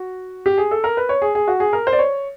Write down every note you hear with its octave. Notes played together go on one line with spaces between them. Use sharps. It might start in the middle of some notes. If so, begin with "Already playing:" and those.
Already playing: F#4
G4
G#4
A4
A#4
B4
C#5
G#4
G#4
F#4
G#4
A#4
C5
D5
C#5